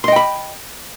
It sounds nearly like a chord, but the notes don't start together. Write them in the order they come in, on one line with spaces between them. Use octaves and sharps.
C6 D#5 G5 B5